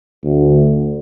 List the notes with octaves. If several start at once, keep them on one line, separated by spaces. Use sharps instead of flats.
D2